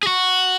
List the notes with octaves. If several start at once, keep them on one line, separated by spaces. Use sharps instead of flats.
G#4
F#4